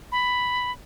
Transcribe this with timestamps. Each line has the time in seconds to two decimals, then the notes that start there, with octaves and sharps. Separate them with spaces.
0.12 B5